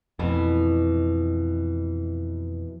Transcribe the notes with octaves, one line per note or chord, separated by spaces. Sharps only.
F2 B2 E3 B3